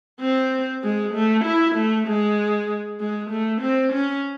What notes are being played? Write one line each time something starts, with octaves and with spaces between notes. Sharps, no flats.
C4
G#3
A3
E4
A3
G#3
G#3
A3
C4
C#4